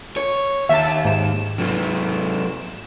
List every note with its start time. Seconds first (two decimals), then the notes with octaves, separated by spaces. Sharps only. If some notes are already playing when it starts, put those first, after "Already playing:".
0.17 C#5
0.69 D#2 E5 A5
1.05 G#2 E7
1.58 C3 F#3